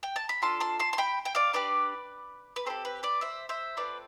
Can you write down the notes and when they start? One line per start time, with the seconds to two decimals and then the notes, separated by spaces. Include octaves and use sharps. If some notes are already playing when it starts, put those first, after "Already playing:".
0.03 G5
0.16 A5
0.29 B5
0.42 D4 F4 A4 A5 C6
0.60 A5 C6
0.79 A5 C6
0.93 C6
0.98 G5 B5
1.25 G5
1.35 D5 F5
1.53 D4 G4 B4 D5
2.56 B4
2.66 C4 G4 A4 C5
2.85 B4
3.03 B4 D5
3.21 C5 E5
3.49 C5 E5
3.77 A3 C4 F4 B4 D5